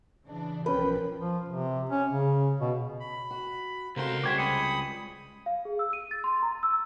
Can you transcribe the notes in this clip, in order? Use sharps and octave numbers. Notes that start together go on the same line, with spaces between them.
C#3 E3 D4
B1 F3 C#4 A#4 B4 G5
F3
C3
C#4
C#3
B2
B5
F#4
C#2 C3 F#4 A4 A#4 C5 F5 C6
G3 C4 F#4 G#4 C5 D6 G#6 B6
B5 D#6 C#7
F5
G#4
E6
D#7
A6
C6
A#5
E6